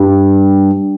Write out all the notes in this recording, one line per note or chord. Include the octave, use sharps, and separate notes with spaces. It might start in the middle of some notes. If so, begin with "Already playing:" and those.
Already playing: G2